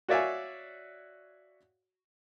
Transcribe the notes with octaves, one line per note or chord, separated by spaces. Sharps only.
F#4 C#5 D5 E5 F5 G#5